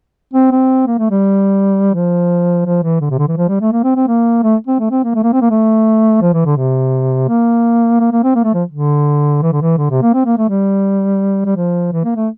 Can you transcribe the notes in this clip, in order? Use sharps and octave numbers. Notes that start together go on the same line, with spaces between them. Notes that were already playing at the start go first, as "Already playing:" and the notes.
C4
C4
A#3
A3
G3
F3
F3
E3
D3
C3
D3
E3
F3
G3
A3
A#3
C4
C4
A#3
A3
C4
A3
C4
A#3
A3
A#3
C4
A#3
A3
F3
E3
D3
C3
A#3
A#3
A#3
C4
A#3
A3
F3
D3
E3
D3
E3
D3
C3
A#3
C4
A#3
A3
G3
G3
F3
E3
A#3
A3